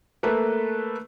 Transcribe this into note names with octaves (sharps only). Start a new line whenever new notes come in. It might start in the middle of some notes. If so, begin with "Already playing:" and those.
A3 A#3 A4 B4